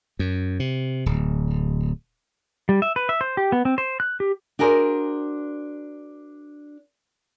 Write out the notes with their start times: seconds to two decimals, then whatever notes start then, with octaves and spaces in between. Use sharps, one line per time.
0.19 F#2
0.60 C3
1.06 D1
2.69 G3
2.82 E5
2.96 B4
3.09 E5
3.21 C5
3.37 G4
3.52 B3
3.65 C4
3.78 C5
4.00 F#6
4.20 G4
4.59 D4 F#4 G#4 A#4 C5